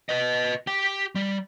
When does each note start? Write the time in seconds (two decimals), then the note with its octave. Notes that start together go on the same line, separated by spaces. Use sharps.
0.09 B4 D#5
0.67 G4 G5
1.15 G3